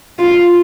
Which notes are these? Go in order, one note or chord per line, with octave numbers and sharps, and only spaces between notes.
F4